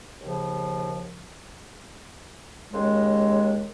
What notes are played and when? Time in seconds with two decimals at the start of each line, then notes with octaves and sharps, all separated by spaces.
0.19 D#2 C#3 F3
2.72 D#2 C#3 G#3